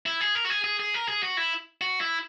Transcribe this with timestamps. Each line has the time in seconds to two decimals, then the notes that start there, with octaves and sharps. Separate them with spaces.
0.06 E4
0.21 G#4
0.35 A#4
0.45 F#4
0.50 G#4
0.64 G#4
0.80 G#4
0.94 A#4
1.08 G#4
1.23 F#4
1.37 E4
1.81 F#4
2.01 E4